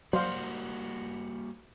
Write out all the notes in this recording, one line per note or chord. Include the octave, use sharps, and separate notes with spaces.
F#3 G3 A#3 F#4 C5 D5 F5